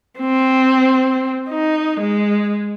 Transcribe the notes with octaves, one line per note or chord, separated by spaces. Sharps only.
C4
D#4
G#3